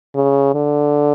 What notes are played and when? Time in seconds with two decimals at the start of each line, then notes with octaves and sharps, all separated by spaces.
0.15 C#3
0.55 D3